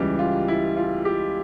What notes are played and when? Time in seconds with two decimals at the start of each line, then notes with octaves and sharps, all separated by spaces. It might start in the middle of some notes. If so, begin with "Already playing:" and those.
Already playing: C#2 C#3 E3 G3 G4
0.19 F4
0.48 E4
0.77 F4
1.05 G4